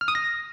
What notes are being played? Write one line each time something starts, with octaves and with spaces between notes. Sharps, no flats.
F6
D#6
A#6